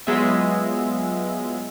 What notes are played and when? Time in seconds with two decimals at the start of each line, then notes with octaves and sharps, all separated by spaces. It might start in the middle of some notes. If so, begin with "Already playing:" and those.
0.07 F#3 G#3 B3 F4 E5